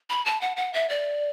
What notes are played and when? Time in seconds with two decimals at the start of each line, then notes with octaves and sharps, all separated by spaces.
0.10 B5
0.26 A5
0.41 F#5
0.57 F#5
0.74 E5
0.89 D5